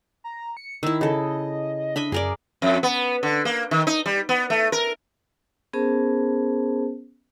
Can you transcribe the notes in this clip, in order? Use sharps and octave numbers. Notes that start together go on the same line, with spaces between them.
A#5
C#7
D#3 E4 E6
C#3 A4 D#5
D4 D#5 E5 B5
F#2 G#4 A#4 D5
F2
B3
D3
A#3
D#3
D#4
G3
B3
A3
A#4
B3 C#4 G#4 A#4 C5 A5